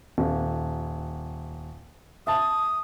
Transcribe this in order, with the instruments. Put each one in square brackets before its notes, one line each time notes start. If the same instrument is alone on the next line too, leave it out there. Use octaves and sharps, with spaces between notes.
[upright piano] D#1
[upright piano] E5 A5 [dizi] D#6